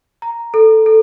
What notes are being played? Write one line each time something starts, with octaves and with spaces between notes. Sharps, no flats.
A#5
A4
A4